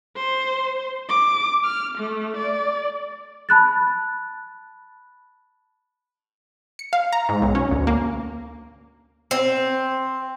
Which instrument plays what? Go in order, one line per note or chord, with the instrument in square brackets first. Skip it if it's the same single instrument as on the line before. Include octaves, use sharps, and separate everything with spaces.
[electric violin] C5
D6
F6
A3
D5
[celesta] A5 B5 F#6 A6
[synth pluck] C#7
F5
A#5
G#2
B1
C#4
D2
A#3
[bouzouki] C4